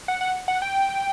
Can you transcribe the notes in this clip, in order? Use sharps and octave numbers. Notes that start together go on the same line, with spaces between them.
F#5
F#5
F#5
G5